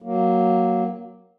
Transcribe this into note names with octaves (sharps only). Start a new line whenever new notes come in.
F#3 A#3